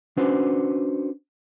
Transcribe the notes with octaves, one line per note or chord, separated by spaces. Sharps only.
C#4 D4 F#4 B4 C5